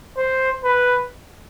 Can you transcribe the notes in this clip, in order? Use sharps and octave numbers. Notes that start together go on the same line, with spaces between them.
C5
B4